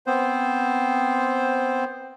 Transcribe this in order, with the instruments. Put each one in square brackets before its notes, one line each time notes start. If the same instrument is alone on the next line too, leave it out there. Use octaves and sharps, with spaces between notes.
[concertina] B3 C4 C5